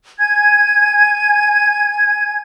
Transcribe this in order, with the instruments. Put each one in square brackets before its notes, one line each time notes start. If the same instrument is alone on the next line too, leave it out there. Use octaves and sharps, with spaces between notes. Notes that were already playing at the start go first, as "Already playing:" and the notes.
[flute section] G#5 G#6